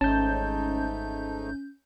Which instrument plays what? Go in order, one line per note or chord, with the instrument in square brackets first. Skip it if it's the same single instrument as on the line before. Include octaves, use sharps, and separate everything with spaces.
[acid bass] G#1 [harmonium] G#2 A3 D#4 [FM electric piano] C#4 G6 [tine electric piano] A5